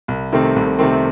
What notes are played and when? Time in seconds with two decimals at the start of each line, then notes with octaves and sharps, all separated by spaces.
0.08 C2
0.33 C3 D#3 A3 C4
0.56 C2
0.79 C3 D#3 A3 C4